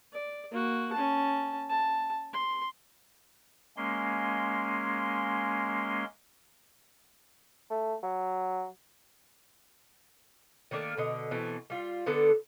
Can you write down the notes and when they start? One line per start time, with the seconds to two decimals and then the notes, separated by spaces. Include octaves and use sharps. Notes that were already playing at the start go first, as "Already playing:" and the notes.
0.13 D5
0.51 A#3 F#4
0.93 C#4 A5
1.70 A5
2.33 C6
3.77 G#3 A#3 C#4 C6
7.70 A3
8.03 F#3
10.71 D#3 A3 A#3 D4
10.97 B2 D3 D#5
11.31 B2 E3 A3 C4
11.70 G3 F4
12.06 D3 B3 D4 A4